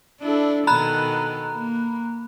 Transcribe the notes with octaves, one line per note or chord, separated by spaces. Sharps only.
D4 E4 A4
B2 D#3 A4 A#5 B5 F#6
A#3